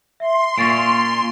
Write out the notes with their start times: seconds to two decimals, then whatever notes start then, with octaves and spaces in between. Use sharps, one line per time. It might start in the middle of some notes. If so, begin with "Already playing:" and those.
0.20 E5 C6
0.58 A#2 C#4 C#6 A6 D7